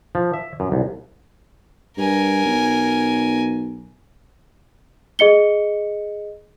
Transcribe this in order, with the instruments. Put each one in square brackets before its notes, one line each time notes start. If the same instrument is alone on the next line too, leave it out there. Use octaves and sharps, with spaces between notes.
[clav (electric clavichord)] F3
E5
F#2
C2
[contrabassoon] G2 [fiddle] A#4 G#5
[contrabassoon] B1
[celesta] G#4 D#5 C#7 G7